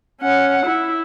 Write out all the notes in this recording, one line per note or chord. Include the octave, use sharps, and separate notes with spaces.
C#4 F#5
E4